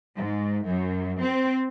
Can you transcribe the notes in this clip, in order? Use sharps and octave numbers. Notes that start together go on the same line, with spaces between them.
G#2
F#2
C4